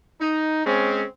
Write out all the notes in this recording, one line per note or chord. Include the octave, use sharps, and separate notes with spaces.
D#4
G#3 C4 C#4